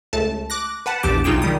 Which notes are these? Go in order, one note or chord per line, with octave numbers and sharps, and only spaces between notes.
C#2 A3 A5
D6 F#6 A#6
B4 F#5 A5
A#1 E2 G4 A5 D6
B1 D#4 F4 G#4 G5 E7
D#3 G3 D#6